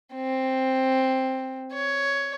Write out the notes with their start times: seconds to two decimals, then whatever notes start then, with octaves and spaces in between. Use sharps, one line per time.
0.15 C4
1.73 C#5